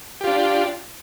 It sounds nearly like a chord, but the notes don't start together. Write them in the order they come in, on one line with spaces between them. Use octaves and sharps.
G4 F4 D4